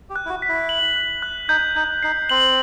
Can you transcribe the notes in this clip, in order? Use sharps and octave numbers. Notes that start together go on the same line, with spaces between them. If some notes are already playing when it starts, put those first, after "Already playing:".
G4
F#6
E4
F#4
B6
E4
F#7
F#6
F#6
D#4 G6
D#4 G6
D#4 C7
C4 F#7